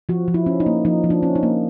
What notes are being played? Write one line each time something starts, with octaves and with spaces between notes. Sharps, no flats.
F3 F#4
F3
E4
C#4
D#4
A#3
F3 D#4
F3
D4
C#4
D#4
A#3